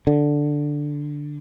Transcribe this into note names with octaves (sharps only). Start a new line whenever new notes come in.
D3